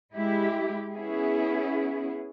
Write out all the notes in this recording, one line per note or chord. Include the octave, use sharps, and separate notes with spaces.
G#3 E4 G4
B3 C#4 E4 G#4